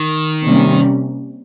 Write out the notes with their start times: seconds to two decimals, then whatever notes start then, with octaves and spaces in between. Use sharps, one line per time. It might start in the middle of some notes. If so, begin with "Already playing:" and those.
Already playing: D#3
0.45 C3 G3 A#3 C#4